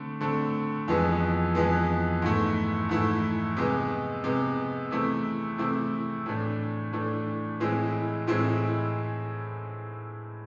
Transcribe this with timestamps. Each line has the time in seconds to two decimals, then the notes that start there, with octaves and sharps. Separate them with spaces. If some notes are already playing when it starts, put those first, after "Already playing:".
Already playing: D3 A3 C4
0.21 D3 A3 C4
0.88 F2 E3 G#3 B3
1.55 F2 E3 G#3 B3
2.22 G#2 E3 A3 E4
2.89 G#2 E3 A3 E4
3.57 C3 G#3 B3
4.24 C3 G#3 B3
4.91 C3 E3 A3 C4 E4
5.58 C3 E3 A3 C4 E4
6.26 A2 E3 A3 D4
6.93 A2 E3 A3 D4
7.60 A2 E3 G#3 C4 E4
8.27 A2 E3 G#3 C4 E4